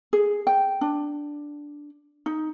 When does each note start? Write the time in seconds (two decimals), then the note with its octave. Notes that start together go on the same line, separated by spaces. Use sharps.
0.13 G#4
0.47 G5
0.81 D4
2.26 D#4